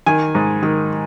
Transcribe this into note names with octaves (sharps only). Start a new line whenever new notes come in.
D#3 G#5
G#2
D#3